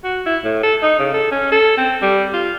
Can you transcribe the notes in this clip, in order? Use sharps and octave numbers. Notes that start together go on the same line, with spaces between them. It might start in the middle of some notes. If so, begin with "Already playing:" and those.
F#4
E4
A2
A4
D#4
C#3
A4
C#4
A4
C4
G3
F4